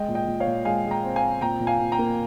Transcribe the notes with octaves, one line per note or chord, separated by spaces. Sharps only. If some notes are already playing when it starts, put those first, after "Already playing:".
Already playing: G#3 D#5 G5
A#2
D#5 G5
A#2
C#5 F5
A#2
G#3 F5 G#5
G#3
G5 A#5
C4
F5 G#5
C4
A#2 G5 A#5
A#2
F5 G#5
A#2
G5 A#5
A#3